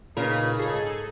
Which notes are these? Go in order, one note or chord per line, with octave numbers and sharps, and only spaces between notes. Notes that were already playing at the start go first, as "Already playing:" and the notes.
A#2 C#3 D#4 A#4 B4
G#2 D#4 G#4 A4